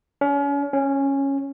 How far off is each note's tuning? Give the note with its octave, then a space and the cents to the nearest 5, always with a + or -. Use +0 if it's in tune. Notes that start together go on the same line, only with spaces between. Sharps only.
C#4 +35
C#4 -10